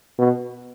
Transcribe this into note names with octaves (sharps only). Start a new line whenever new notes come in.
B2